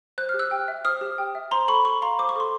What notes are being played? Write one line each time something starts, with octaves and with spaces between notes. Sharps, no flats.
C5 F#6
G4 F6
E6 F#6
G5
E5
C5 D#6 F6
G4
G5
E5
C5 A#5 C6
A4 B5 C#6
A4 B5 C#6
F5 A#5 C6
C5 D6
C#6
A4 C6